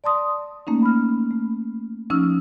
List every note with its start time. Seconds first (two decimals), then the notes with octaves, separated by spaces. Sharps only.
0.04 D5 A5 C6 D#6
0.67 A3 A#3 C#4 D#4
0.83 B5 F6
1.31 A3
2.10 F3 C#4 D#4 E6 F6